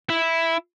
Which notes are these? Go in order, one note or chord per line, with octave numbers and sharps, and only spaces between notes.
E4